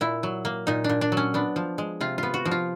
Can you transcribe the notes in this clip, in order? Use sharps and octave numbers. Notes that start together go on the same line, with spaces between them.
A#2 E4
F#3
A#3
A#2 D#4
D4
A#2
D4
F#3
C#4
B3 D4
F3
G#3
C3 F4
B3 F4
F#4
F3
F4